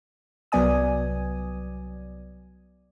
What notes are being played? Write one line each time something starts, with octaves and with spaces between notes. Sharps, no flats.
C2 F#3 B3 D5 G#5 D#6